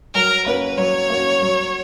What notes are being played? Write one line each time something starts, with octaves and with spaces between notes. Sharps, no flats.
F#3 A#4
A#3 C#4 F#4 B4
F#3 C#5
A#3 C#4 F#4
F#3